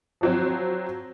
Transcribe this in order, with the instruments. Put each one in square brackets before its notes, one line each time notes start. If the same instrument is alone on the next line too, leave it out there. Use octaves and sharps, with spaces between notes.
[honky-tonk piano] F3 F#3 C4